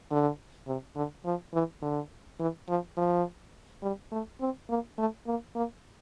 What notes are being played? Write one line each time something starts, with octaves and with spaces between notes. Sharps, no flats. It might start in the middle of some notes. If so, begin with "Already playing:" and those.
D3
C3
D3
F3
E3
D3
E3
F3
F3
G3
A3
C4
A#3
A3
A#3
A#3